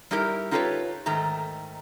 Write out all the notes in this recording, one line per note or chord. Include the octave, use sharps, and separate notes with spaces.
G3 D#4 E4 G4 A#4
D#4 F4 G4 A4 B4 C#5
G#2 D#3 A3 A#5